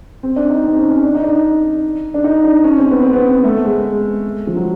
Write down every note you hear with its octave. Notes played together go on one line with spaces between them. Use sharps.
C4
D4
D#4
C4
C#4
C#4
D4
D#4
D4
D4
D#4
D4
C#4
C4
B3
C4
B3
A3
G#3
F3
F#3